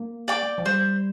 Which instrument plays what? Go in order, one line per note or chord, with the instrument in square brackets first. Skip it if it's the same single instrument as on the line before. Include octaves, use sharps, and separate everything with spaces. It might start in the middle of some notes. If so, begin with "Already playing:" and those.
Already playing: [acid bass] A#3
[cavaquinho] D5 G5 D6
[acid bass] F3
[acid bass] G3 [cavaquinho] C5